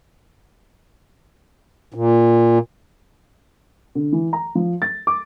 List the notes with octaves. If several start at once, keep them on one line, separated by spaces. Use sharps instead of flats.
A#2
D3
E3
A#5
F3
A6
D6